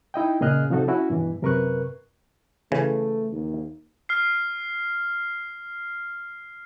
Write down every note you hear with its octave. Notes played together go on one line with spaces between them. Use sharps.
D#4 E4 D#5 G5
A#2 C#3 G#4 D#5 F6 F#6
C3 F3 D#4 F#4 A4
C#4 E4 F#4
G2 B2 E3
F#2 C3 A#4 B4 C#6 F#6
C#3 E3 A3
D#2
F6 C7